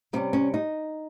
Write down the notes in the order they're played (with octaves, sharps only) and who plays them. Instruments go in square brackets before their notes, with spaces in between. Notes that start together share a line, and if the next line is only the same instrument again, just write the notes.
[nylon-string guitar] C3 G3 C#4 D#4
C#4
D#4